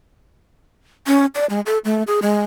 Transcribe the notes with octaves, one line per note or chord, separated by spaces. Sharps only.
C#4
D5
G#3
A4
A3
G#4
G#3